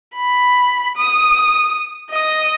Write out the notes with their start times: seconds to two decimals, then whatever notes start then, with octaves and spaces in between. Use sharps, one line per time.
0.16 B5
0.97 D#6
2.10 D#5 D#6